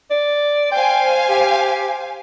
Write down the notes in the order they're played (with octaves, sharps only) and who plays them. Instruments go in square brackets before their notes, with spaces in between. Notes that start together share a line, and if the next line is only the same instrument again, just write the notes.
[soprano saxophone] D5
[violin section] C5 F5 G#5 [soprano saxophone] G5
[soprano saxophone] G4